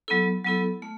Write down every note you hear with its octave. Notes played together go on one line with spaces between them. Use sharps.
F#3 B3 E4 A4
F#3 B3 E4 A4
A3